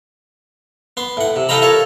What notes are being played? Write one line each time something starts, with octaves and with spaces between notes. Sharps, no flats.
B3 C6
A2 F#5
C3
A4 D#5 F5 G5 A#5 B5
F4 A4 A#4 C#5